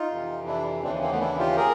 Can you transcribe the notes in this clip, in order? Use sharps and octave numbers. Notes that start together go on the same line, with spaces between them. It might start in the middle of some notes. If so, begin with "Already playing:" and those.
Already playing: D#4 F4
F2 C3 E3
D4 E4
D#2 C#3 E3 C4 D4
A#3 C4
A3 B3
D4 E4
F4 G4
G#4 A#4